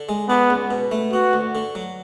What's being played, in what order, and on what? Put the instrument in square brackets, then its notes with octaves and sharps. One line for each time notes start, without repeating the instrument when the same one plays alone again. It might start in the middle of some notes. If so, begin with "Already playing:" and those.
Already playing: [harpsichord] D3
G#3
[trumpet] B3 [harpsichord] D4
[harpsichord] C#2
B2
A3
[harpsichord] B3 [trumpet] F#4
[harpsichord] D2
D3
F#3